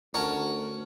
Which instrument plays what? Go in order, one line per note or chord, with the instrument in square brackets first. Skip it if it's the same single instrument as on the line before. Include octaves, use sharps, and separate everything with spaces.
[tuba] D2 [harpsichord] C#4 [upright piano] A#4 F#5 A5